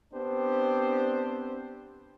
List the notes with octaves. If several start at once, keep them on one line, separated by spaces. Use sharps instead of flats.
B3 C4 D4 G4 C5